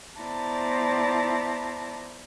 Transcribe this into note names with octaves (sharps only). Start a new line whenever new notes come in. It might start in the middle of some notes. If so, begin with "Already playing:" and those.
B3 E4 C5 D5 A5 A#5